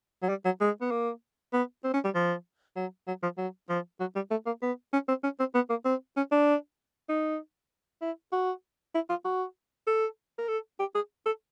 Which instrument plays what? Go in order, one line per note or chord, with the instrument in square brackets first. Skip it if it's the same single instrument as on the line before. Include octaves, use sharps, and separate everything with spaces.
[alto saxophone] F#3
G3
F#3
G#3
B3
A#3
B3
C4
C#4
G3
F3
F#3
F#3
F3
F#3
F3
F#3
G3
A3
A#3
B3
C#4
C4
C#4
C4
B3
A#3
C4
C#4
D4
D#4
E4
F#4
E4
F4
F#4
A4
A#4
A4
G4
G#4
A4